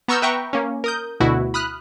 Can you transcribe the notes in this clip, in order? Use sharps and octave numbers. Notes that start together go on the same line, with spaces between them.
B3 A#5 C#6 E6 F6 G6
B4 E5 G5 A#5 C#6
A#3 C#4
A#4 D#6 G6
D2 B2 E4 F#4
B5 D#6 F6 F#6